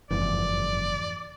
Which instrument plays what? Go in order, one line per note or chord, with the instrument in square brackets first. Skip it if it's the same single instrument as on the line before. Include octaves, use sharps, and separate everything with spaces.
[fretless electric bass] F#1 [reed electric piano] F2 G#2 E3 [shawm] D5